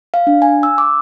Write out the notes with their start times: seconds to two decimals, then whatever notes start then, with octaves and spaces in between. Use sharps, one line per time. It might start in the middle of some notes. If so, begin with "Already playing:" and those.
0.14 F5
0.27 D4
0.42 G#5
0.63 E6
0.78 D6